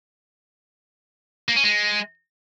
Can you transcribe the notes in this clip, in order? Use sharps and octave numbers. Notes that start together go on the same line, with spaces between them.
A#3
C#4
G#3